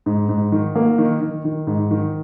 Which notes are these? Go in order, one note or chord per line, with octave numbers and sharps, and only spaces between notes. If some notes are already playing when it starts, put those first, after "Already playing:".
G#2
G#2
D#3
A#3
D#3
D#3
D#3
G#2
D#3